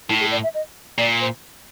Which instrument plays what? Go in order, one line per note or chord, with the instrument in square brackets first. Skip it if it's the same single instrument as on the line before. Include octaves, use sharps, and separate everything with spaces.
[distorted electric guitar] A2 [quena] E4
[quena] G#4
D5
E5
D#5
[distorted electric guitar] A#2 [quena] D5
[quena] C5